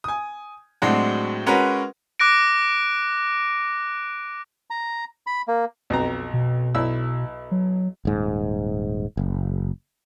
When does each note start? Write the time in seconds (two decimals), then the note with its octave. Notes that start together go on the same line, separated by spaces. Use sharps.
0.04 G#5 D#6
0.82 A2 F#3 G#3 C4 D4 F#4
1.46 G#3 C#4 F#4 A#4 B4
2.20 D6 F#6 A#6 D7
4.70 A#5
5.27 B5
5.48 A#3
5.90 B1 F2 A#5
6.34 B2
6.75 B1 E4 E6
7.52 F#3
8.05 D#1 G#2
9.17 F#1